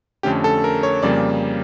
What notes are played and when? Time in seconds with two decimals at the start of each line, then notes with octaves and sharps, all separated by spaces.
0.23 F2 D3 A3 C#4 G4
0.44 A4
0.64 A#4
0.83 C#5
1.02 F2 C#3 G3 A#3 D5